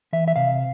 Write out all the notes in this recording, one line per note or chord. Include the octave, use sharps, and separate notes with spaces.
E3 E5
E5
C3 F5